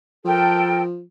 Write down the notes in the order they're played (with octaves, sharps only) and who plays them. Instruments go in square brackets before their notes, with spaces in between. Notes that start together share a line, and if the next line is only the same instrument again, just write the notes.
[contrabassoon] F3 [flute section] A4 A#4 G5